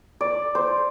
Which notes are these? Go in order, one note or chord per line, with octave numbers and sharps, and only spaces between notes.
D5
C5